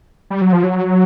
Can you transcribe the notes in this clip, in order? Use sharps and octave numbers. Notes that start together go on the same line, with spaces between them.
G3
F#3
F3
F#3